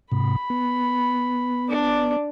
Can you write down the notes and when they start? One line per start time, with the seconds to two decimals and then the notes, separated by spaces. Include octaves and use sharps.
0.12 G#2 C3 B5
0.50 B3
1.69 D4 D5